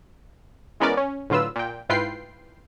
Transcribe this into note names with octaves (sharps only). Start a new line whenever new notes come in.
E3 G#3 B3 C#4 A#4 D5
C#4
A2 D3 F#3 F4 B4 E6
A#2 G5
G#2 E4 F4 B4 G5 C7